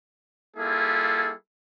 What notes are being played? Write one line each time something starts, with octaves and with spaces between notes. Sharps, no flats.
G3 A#3 E4 F4 G#4 A4